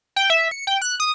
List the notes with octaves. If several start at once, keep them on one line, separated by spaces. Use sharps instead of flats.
G5
E5
C#7
G5
F#6
D#6